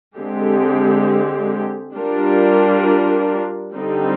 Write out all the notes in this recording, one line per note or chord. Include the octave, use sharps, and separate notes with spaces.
D3 G#3 C4 G4
G3 D4 F4 A#4
D3 G3 C4 D#4